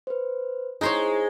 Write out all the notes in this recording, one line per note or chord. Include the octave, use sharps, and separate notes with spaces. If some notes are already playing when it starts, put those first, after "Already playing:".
B4 C5
G#3 D#4 E4 C5 C#5